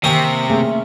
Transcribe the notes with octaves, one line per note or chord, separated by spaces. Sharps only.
C3 D#3 A#3 G5 G#5 C#6 D#6
A3 A#3 C#4 G#4